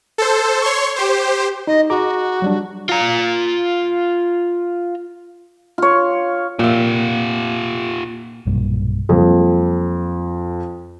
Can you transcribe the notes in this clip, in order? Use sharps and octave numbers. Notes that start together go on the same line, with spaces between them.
A4 C5
C#5 C6 C#6
G4 C5
D#4 D#5
F#4 G#4 A#5 D6
F#3 G3 D4
F4 A#5
F4 C#5
A#2 A#3 F4 G4 E5
B1 G2 A#2
F2 F#3 G3 A#3